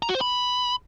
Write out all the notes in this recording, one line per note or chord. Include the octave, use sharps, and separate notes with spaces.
A#5
F#4
C5
B5